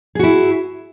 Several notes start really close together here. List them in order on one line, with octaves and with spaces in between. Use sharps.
G#4 F#4 E4